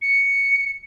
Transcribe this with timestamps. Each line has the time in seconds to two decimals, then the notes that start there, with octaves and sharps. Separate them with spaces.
0.02 C#7